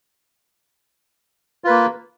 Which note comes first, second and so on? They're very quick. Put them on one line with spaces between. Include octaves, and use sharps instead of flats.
F4 B4 A#3